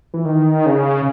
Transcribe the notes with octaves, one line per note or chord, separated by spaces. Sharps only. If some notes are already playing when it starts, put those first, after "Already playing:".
E3
D#3
C#3